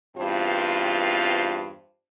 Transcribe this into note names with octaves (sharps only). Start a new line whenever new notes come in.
E2 G2 C4 F4 C5